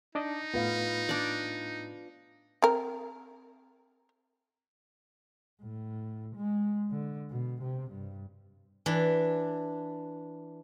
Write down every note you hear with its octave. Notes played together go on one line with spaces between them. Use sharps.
D4 D#4 D5 D#5
A2 B3 F4 B4 F5
D4 D5
C4 A#4
A2
G#3
D3
B2
C3
G2
E3 D4